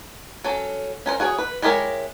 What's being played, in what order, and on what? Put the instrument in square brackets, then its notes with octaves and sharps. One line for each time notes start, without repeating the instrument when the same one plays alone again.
[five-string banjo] F#3 C#4 A4
C#4 A#4 C5
F#4 G#4 A#4 C#5
B4
G#3 E4 G4 A#4 C#5